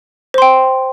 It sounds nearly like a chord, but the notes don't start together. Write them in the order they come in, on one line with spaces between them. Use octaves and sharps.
C5 C6 G5